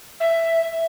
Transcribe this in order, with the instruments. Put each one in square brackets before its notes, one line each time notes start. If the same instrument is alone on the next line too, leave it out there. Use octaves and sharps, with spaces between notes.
[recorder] E5